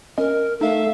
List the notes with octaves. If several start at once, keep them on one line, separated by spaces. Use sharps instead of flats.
C#4 A#4 D#5
A3 D#4 E5 F5